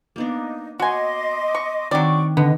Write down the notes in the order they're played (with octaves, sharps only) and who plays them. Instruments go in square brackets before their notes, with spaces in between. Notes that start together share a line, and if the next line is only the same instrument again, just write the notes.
[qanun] A#3 B3 D4 [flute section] D#4
[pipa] F#4 G#5 [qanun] C#5 [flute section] D#5 C6 D6
[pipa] C#6
[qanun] D#3 C4 D4 [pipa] F#3 D5 [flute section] G5 C#6
[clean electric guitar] D3 [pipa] B3 [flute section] D#5